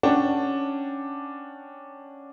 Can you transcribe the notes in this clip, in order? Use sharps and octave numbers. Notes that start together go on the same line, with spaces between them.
C#4 D4 F#5 G5 A5